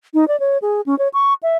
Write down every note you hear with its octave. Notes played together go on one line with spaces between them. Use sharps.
D#4
D5
C#5
G#4
C#4
C#5
C#6
E5